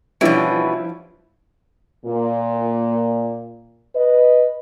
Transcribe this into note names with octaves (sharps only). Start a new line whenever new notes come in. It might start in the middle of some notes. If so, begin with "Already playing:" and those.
B2 E3 F3 G3 C#4 D4 E4 D7
A#2
B4 D#5